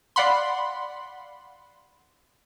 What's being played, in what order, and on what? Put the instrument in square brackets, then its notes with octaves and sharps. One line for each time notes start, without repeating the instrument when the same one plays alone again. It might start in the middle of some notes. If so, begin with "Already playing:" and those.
[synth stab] D5 F5 F#5 B5 C6